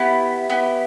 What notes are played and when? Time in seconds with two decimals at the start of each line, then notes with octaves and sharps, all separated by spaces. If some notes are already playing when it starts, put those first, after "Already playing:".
Already playing: B3 E4 G4
0.50 B3 E4 G4